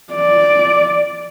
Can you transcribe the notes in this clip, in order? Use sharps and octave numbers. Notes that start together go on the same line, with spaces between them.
D5